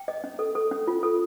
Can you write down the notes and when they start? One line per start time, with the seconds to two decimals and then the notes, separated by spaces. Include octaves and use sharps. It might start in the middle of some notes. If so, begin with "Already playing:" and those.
Already playing: G5
0.08 D#5
0.24 C#4
0.39 A4
0.55 A4
0.71 C#4
0.87 F4
1.03 A4